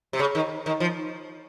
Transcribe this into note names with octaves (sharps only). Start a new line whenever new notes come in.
C3
C#3
D#3
D#3
F3